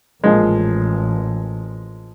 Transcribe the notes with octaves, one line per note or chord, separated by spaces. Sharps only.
A1 A#2 F3 G#3